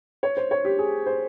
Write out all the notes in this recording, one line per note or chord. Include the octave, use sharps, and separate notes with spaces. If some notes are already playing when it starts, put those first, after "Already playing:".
C#5
C5
C#5
G4
G#4
C5